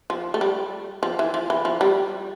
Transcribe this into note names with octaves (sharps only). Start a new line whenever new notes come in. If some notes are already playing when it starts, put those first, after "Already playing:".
F3
A3
G3
F3
E3
F3
E3
F3
G3